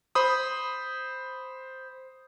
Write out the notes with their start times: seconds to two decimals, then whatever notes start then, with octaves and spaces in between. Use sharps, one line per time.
0.15 C5 B5 D#6